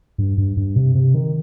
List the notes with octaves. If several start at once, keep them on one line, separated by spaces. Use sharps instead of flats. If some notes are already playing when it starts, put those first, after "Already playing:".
G2
G2
G2
C3
C3
D#3